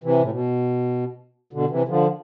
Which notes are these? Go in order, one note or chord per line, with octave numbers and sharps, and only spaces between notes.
C3 E3
A2
B2
B2 D3
C3 E3
D3 F3